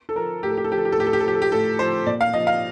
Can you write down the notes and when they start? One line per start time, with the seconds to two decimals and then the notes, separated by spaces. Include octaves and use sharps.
0.09 A4
0.15 F3 A#4
0.43 A2 G4
0.50 A4
0.57 G4
0.64 A4
0.71 F3 G4
0.78 A4
0.85 G4
0.92 A4
0.97 A2 G4
1.07 A4
1.13 G4
1.20 A4
1.25 F3 G4
1.35 A4
1.42 G4
1.52 A2 A4
1.79 F3 C5
2.07 A#2 D5
2.21 F5
2.33 F3 D#5
2.47 F5